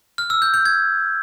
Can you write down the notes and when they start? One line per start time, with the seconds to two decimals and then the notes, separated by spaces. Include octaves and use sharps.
0.18 F6
0.30 E6
0.42 G6
0.54 G6
0.65 G#6